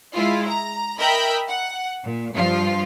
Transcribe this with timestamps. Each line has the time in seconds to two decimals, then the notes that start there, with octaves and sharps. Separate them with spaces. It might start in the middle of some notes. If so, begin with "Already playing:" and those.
0.15 G#3 E4 F4
0.48 A#5
0.98 A#4 D#5 E5 G5 B5 G6
1.49 F#5
2.03 A#2
2.33 G2 F3 F4